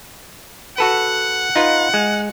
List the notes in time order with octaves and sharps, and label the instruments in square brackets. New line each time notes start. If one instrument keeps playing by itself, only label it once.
[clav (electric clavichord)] F#4 A4 B4 [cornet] F#5
[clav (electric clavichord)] D#4 F4 B4
G#3